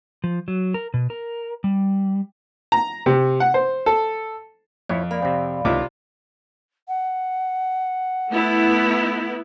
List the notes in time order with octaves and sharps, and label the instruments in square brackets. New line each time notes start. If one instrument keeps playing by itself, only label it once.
[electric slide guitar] F3
F#3
A#4
B2
A#4
G3
[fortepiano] A#5
C3
F#5
C5
A4
[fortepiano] F2 [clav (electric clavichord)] E4 C#5
[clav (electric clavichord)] A#3 [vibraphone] D5 F5 B5
[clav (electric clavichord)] C3 C4
[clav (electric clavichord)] C#2 D#3 E4 [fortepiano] C3 F4 D6
[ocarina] F#5
[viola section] A3 B3 E4